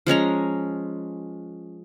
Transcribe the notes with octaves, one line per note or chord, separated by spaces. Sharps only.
F3 G#3 C#4 A#5